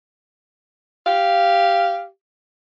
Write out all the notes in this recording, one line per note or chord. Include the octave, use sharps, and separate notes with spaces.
G4 F5